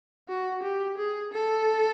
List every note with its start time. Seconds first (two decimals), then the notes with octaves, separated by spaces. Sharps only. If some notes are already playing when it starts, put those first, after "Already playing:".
0.29 F#4
0.63 G4
0.97 G#4
1.32 A4